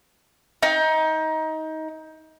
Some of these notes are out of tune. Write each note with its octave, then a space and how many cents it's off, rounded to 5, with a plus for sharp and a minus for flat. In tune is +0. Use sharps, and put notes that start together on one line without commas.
D#4 +20